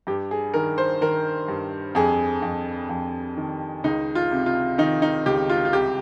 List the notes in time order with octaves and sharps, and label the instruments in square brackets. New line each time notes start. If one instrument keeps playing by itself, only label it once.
[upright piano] G2 G4
G#4
D#3 A#4
C5
D#3 A#4
G2
F2 G#4
F2
F2
D#3
C#2 D#4
F4
C3
F4
D#3 D#4
D#4
C#2 G4
F4
F4
C2 G4